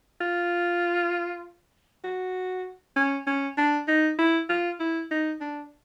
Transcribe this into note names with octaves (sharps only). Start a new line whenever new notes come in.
F4
F#4
C#4
C#4
D4
D#4
E4
F4
E4
D#4
D4